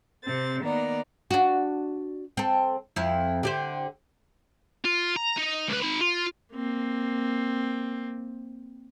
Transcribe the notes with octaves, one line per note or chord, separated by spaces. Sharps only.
C3 C4 A6
D#3 A#3 B3 D5 A#5
D4 F#4
C4 A4
F2 E4
D3 G4 C5
F4
A#5
D#4
C#2 B4
D#4 B5
F4
A#3 C4